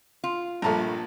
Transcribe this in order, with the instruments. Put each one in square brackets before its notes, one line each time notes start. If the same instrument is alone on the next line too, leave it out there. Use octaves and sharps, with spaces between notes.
[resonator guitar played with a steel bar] F4
[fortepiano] A#1 A5 A#5 [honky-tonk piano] G2 F3 A3